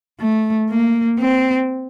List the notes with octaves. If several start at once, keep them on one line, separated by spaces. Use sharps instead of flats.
A3
A#3
C4